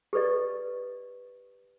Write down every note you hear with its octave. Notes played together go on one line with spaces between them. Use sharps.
G4 A4 B4 D5 D#5